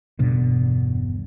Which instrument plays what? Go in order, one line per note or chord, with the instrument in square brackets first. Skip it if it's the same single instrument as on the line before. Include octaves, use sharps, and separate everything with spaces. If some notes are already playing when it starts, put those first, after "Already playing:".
[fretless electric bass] E1 G2 B2 D3